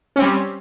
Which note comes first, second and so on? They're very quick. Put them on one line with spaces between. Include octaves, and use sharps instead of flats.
C#4 C4 G3